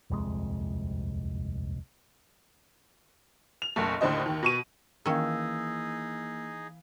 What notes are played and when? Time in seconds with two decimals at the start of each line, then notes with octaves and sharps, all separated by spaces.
0.10 D#1 C2 F2 G#3
3.62 F7
3.76 F#1 B1 A3
4.01 D#2 A2 D3 C5 D#5
4.26 D#2 D#3
4.43 B2 C#6 D#7
5.06 D#3 E3 A#3 C#4 D#4 G#4 F5 E6